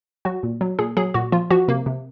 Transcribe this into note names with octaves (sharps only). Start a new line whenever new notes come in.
F#3 F#4
A#2
F#3
A#2 G#4
F#3 G#4
A#2 F#4
F3 F4
F3 F#4
C3 A#3
C3